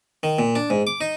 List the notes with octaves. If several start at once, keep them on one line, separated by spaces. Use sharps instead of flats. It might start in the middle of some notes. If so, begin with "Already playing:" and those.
D#3
A#2
D4
G#2
D6
D#4